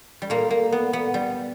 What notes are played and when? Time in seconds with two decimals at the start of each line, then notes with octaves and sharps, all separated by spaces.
0.22 G3
0.30 A#2 A#3
0.51 A#3
0.72 B3
0.93 B3
1.14 G3